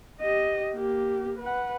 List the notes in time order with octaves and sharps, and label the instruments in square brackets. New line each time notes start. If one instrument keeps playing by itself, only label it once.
[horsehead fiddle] G4 D#5
A#3 G4
B4 F#5